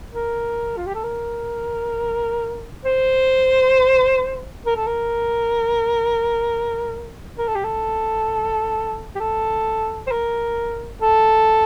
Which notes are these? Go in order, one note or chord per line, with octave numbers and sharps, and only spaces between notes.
A#4
F4
G4
A4
A#4
C5
A#4
A4
A#4
A#4
A4
G4
A4
G4
A4
C5
A#4
A4